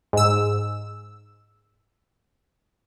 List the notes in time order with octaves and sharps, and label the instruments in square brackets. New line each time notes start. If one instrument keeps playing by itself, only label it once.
[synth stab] G#2 E6